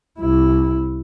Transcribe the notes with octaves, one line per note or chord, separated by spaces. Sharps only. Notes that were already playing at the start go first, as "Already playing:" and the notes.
C2 E4